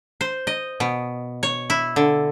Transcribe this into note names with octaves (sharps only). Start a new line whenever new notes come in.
C5
D#5
B2
C#5
E4
D3